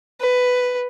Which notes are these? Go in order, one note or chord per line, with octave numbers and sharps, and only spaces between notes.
B4